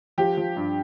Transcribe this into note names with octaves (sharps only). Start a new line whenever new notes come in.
F3 G4
F3
G2